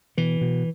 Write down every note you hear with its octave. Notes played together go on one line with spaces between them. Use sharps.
B2 E3
B2